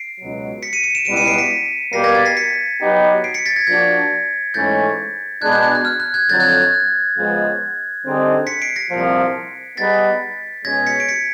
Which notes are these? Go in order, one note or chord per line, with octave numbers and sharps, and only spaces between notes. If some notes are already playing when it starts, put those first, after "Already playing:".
Already playing: C7 D7
C#2 B2 F#3
B6 C#7
C#7 D#7
C#7 D#7
D7 E7
C#2 B2 G3 B3 E4 D7 E7
C#7 D#7
C7 D7
B6 C#7
B2 G3 A#3 A#6 C7
G#6 A#6
A6 B6
A#6 C7
B6 C#7
F#3 B3 D#4 G4 B4
C7 D7
B6 C#7
A6 B6
G#6 A#6
F3 A#3 D4 F#4 G#6 A#6
G#2 E3 A3 C#4 G6 A6
B2 G#3 B3 D4 F#6 G#6
G6
G6
F#6
F6
F#6
F#6 G#6
F2 D3 F#3 G6 A6
F#6 G#6
G6
F#6
C#2 C#3 F3 G#3 B3
D3 G3 C4 D#4 G#4
B6 C#7
C7 D7
A#6 C7
C2 A#2 F3
G3 B3 D#4 G#4 B4 A6 B6
B2 G#3 C#4 G#6 A#6
B6 C#7
D7
B6 C#7